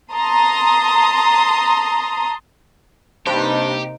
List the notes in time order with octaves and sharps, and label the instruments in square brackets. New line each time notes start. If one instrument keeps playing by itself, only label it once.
[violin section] A5 A#5 C6 D#6
[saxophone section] G2 [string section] C3 A#3 D#4 [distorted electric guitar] G4 [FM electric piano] C5